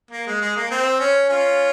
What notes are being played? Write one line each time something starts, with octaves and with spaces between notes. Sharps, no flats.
A#3
G#3
G#3
A#3
C4
C#4
C#4 F4